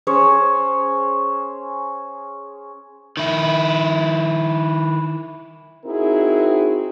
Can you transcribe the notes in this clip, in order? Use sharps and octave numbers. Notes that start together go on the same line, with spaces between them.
C#4 G#4 C5 C#5
D#3 E4
C4 D#4 E4 F#4 G#4 A#4